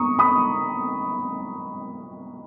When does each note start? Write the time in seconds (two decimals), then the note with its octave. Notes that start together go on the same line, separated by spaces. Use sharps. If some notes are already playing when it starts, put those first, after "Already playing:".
Already playing: A#5 C#6 D#6
0.19 B5 D#6